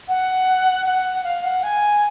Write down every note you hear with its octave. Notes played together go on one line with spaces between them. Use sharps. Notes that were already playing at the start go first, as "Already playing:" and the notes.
F#5
F#5
F5
F#5
G#5